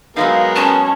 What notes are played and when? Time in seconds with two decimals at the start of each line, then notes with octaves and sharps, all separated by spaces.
0.17 F#3 G#3 B3 D#4 G#4 A#4 F5
0.56 C#4 A5